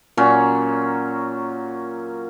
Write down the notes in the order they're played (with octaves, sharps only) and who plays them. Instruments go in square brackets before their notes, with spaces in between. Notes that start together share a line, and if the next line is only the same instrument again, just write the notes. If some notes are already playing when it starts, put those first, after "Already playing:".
[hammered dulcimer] A#2 F#3 C#4